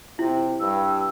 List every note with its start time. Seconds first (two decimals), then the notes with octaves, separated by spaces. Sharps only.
0.19 C3 E4
0.60 G2 E6